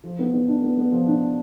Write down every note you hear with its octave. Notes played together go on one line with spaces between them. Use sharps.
F3
B3
B3
D4
B3
B3
F3
D4